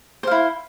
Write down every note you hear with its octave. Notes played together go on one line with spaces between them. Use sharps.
E4 C5 F5